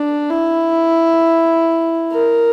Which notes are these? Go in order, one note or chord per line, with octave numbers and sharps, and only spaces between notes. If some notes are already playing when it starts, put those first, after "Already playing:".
Already playing: D4
E4
A#4